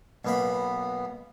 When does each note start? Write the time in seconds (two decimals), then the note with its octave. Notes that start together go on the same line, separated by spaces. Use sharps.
0.25 B1 A#3 B3 B5